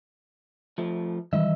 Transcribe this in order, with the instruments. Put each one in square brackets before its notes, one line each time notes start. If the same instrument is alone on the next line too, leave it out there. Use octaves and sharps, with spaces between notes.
[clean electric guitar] F3 A3
[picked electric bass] D#3 E3 G3 [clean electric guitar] D#5 E5